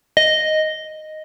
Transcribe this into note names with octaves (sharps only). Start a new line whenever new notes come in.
D#5